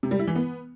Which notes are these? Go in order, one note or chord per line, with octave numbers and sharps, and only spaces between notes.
C3
G3
E4
E3
B3